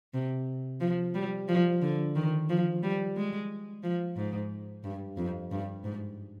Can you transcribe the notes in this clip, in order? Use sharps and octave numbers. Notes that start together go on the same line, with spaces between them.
C3
F3
G3
F3
D3
D#3
F3
G3
G#3
F3
G#2
G2
F2
G2
G#2